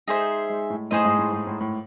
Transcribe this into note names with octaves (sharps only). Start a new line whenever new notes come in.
G#3 D#4 G#4 C5 E5
G#3
A2
A2 D#4 G#4 C5 D#5
G#2
A2
G#2
A2
A2